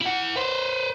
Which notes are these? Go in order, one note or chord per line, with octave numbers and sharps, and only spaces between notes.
E4 F#5
B4 C5